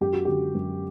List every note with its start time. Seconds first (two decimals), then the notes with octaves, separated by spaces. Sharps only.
0.01 F#2 G4
0.13 F#4
0.25 D3 G4
0.55 F#2